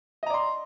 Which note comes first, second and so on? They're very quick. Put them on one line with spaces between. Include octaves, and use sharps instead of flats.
D#5 A#5 D5 C6